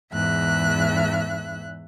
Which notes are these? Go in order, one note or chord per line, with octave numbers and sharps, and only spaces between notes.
E2 G#2 E5 F#6